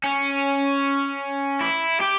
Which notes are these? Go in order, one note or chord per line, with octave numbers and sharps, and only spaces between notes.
C#4
E4
G4